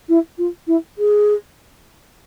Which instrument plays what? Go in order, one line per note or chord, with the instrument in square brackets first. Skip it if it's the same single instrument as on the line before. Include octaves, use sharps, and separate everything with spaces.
[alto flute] E4
F4
E4
G#4